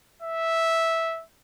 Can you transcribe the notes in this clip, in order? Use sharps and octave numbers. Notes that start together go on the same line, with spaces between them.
E5